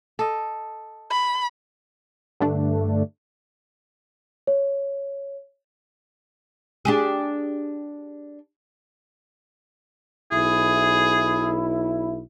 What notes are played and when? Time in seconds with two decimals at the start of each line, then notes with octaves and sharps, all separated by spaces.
0.19 A4 D#5
1.11 B5
2.40 G2 D3 A3 D4
4.47 C#5
6.85 D4 G4 G#4
10.31 B1 E4 G#4